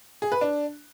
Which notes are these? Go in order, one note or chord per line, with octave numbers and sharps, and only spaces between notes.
G#4
B4
D4